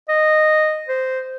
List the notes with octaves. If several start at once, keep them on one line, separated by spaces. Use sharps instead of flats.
D#5
C5